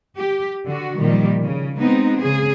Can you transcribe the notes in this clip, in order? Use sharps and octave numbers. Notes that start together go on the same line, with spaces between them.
G4
D3 F#4
A#2 D#3 F3 G3
C#3
G#3 B3 C4 D#4
C#3 G#4